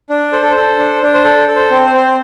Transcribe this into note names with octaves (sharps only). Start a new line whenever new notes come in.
D4
A4 C5
A4
C5
A4
D4
D4
C5
A4
A4
C5
C4
C5
C4